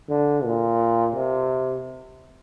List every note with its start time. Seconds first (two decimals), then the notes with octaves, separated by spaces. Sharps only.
0.09 D3
0.44 A#2
1.15 C3